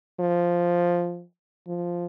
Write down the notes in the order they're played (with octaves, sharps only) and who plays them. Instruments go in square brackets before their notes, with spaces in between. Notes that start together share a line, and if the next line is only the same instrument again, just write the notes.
[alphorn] F3
F3